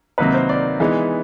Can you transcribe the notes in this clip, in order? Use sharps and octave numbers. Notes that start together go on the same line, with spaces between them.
C3 D#3 F#3 A#3 D#4 B4
C5
D5
E3 G#3 B3 D#4